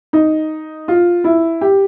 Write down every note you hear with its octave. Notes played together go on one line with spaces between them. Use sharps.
D#4
F4
E4
G4